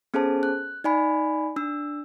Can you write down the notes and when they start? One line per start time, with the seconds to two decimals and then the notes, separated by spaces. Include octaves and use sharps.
0.14 B3 C#4 G#4 A4 C5 A5
0.43 F#6
0.84 D#4 D5 G#5 B5
1.56 D4 E6